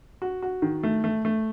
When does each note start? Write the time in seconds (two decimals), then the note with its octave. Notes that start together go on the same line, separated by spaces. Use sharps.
0.22 F#4
0.42 F#4
0.62 D#3
0.83 A3
1.04 A3
1.25 A3